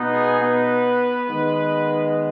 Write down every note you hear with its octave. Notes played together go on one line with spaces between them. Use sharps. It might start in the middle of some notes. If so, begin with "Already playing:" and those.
Already playing: B2 B3 D#4
G#3 G#4
B3 B4
D#3 G#3 B3